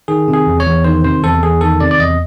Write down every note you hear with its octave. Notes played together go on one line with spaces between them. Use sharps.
D#3 G#4
C3
G#4
E2
C#5
E2
D#3 C5
C3 C5
E2 A4
E2 G#4
D#3 A4
C3 D5
D5
E2 D#5